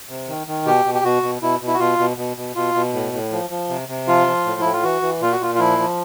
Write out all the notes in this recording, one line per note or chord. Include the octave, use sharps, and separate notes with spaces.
C3
D#3
D#3
B2 G4
B2
G4
B2 F#4
B2
B2 E4
B2
E4
F#4
B2 F4
B2
B2
B2
B2 F4
B2
A2
A2
F3
F3
C3
C3
F3 F4
F3
A2
A2 E4
F4
E3 F#4
E3
A#2 F4
F#4
A#2 F4
F4
F3 E4
F3